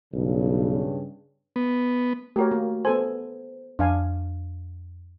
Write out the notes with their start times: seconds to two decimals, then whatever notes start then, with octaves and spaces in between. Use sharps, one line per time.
0.13 B1 G2 C#3
1.56 B3
2.36 A3 F#4 G4 A#4 C#5
2.51 A#3
2.85 B3 A4 C5 G#5
3.79 F2 D4 F5 G#5